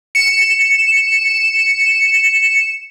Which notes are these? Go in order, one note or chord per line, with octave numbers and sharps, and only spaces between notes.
C#7 E7